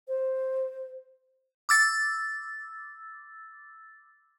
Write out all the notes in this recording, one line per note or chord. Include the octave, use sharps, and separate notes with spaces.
C5
D6 E6 A6